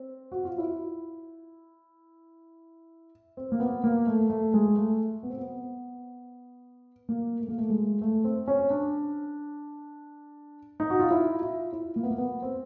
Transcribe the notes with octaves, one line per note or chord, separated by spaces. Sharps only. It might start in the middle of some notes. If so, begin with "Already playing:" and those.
Already playing: C4
F#4
F4
E4
C4
A#3
B3
A#3
A3
A3
G#3
A3
B3
C4
B3
A#3
A3
A#3
A3
G#3
A3
C4
C#4
D4
D#4
F#4
F4
E4
F4
E4
A#3
B3
A#3
B3
C4